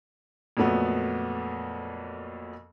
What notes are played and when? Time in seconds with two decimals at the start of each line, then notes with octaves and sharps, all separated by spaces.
0.57 F2 A#2 F#3 A3 B3